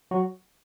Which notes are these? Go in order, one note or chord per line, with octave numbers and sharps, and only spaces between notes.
F#3 F#4